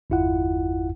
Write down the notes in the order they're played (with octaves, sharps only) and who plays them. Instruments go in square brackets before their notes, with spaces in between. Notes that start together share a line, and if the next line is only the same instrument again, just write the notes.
[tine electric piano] G1 E2 E4 F4 F#5